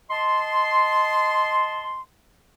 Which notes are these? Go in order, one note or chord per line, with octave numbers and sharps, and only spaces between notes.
D#5 A5 C6